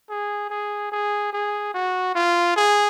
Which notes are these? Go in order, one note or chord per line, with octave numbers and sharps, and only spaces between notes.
G#4
G#4
G#4
G#4
F#4
F4
G#4